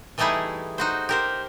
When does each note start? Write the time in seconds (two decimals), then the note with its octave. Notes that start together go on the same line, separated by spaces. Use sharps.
0.18 E3 G3 A3 D#4 E4 G#4
0.78 D#4 F#4 C5
1.09 G4 A#4 C5